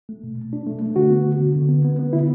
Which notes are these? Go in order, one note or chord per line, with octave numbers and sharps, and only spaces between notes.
A3
B2
B2
D4
A3
A3
D3 F#4
B3
D3
D3
D3
B3
B3
B3
D3 E4